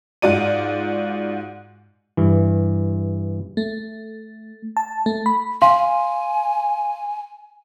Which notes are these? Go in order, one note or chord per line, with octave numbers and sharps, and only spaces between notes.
G#2 F4 F#4 D5 D#7
G2 E3
A3
A5
A3
B5
F5 G#5 C6